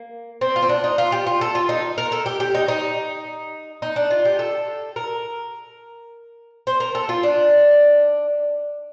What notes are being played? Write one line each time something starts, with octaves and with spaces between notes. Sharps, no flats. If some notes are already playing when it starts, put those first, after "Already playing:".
Already playing: A#3
C4
F4
C4
D4
D#4
F4
G4
F4
A4
F4
D#4
A#4
A4
G4
G4
D#4
D#4
D#4
D4
F4
G4
A4
A#4
C5
A#4
A4
F4
D4